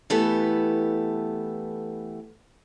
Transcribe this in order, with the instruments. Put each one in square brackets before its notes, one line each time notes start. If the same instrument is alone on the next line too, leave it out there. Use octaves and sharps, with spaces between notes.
[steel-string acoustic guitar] E3 A3 B3 G4 A4